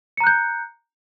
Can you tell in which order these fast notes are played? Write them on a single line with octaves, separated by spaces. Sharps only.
C#7 A#5 F#6 G6